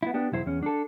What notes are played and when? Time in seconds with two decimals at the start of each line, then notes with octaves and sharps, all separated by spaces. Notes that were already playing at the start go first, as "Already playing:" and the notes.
0.03 B3 E4
0.14 B3 D4 G4
0.32 B1 E2 E4 C5
0.46 E2 C#4
0.63 D4 A4